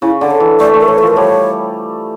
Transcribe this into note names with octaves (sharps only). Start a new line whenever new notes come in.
C#3 E4
D3 D5
C#5
E3
A3 D5
A3
A#4
A3 C#5
A4
F3 A#4
G3 C#5